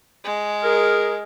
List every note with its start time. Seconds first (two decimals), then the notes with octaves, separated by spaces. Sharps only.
0.24 G#3
0.64 G#4 A#4